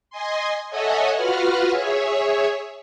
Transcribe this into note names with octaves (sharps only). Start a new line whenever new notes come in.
D#5 G#5 C6
A4 C#5 D#5 E5 F#5 G#5
F4 F#4 B4 F#5 F6
G#4 C#5 E5